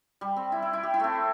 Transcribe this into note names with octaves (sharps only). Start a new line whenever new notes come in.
G3
C4
E4
E4
E4
G4
E4
A3 C4